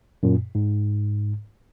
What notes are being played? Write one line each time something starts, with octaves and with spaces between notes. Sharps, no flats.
F#2 A#2
G#2